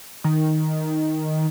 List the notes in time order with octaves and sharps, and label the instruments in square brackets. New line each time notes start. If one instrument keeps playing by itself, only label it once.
[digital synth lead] D#3